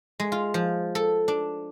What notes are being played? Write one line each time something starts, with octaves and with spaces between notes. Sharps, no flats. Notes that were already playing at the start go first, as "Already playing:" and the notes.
G#3
F4
F3
A4
D4